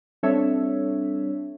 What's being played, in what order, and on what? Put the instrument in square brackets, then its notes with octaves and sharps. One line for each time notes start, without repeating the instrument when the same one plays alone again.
[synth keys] G3 C4 D4 A4 C#5 E5